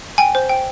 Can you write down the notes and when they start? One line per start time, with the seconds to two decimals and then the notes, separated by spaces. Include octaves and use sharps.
0.18 G5 G#5
0.35 C5
0.49 G5